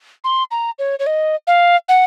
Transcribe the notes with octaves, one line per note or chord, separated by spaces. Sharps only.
C6
A#5
C#5
C#5
D#5
F5
F#5